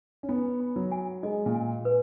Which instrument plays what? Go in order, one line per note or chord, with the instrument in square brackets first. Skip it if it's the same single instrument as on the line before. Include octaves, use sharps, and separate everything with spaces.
[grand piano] C#4
[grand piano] B3 [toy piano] G#5
[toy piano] B5
[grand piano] F#3
[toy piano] G#5
[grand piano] G#3 [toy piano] D#5
[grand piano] A#2
[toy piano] G#5
B4